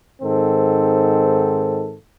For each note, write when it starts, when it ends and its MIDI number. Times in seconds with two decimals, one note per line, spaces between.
0.22 1.96 44
0.22 1.96 51
0.22 1.96 60
0.22 1.96 69